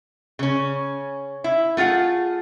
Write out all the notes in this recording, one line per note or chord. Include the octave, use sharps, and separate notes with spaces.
C#3 C#4
E4
A3 F4 G#4 F#5